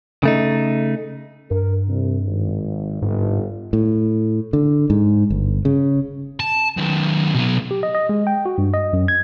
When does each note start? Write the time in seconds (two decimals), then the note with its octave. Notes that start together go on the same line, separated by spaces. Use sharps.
0.23 C#3 A3 D#4
1.51 G2 A#4
1.89 C2 C3
2.26 G#1
3.02 G1 G#2
3.73 A2
4.53 D3
4.90 G#2
5.30 G1
5.65 C#3
6.40 A5
6.77 D#3 F#3
7.34 B2 F#3
7.71 G4
7.83 D#5
7.95 D#5
8.09 G#3
8.27 G5
8.46 F#4
8.58 G2
8.74 D#5
8.93 F#2
9.08 G#6